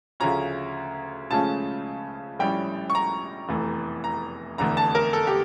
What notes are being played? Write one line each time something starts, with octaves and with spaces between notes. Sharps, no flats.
D2 C#3 F3 C#4 A#5
C#2 C#3 F3 A3 C#4 A5
A#1 A2 G3 C#4 G5
C#6
A#5
F1 E2 E3 A3
A#5
F1 E2 D3 A3 A#5
A5
A#4
A4
G4